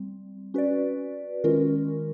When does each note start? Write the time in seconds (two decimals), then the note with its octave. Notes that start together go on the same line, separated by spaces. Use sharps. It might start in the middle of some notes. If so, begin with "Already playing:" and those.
Already playing: G3 C4
0.54 C#4 F#4 B4 D5
1.44 D#3 G#3 C#4 F4 A#4